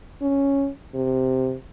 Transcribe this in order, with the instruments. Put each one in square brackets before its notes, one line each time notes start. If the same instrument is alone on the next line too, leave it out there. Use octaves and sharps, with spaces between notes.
[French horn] C#4
C3